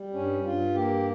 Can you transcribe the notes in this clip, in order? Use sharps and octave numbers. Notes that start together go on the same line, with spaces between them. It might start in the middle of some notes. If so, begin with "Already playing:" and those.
Already playing: G3
G2 C#4
G2 F4
A#3 G4